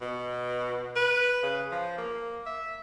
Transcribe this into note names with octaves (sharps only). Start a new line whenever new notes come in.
B2
B4
C#3
F3
A#3
E5